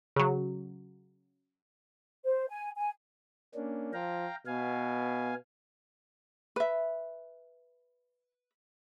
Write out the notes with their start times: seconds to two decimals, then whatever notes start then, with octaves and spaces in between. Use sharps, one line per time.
0.16 C#3 F#3
2.25 C5
2.49 G#5
2.76 G#5
3.55 A#3 C#4 D4
3.93 F3 F5 G5 A#5
4.46 B2 B3 F5 G#5
6.56 B4 E5